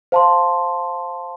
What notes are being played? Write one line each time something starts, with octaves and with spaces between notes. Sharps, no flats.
C5 F5 A5 C6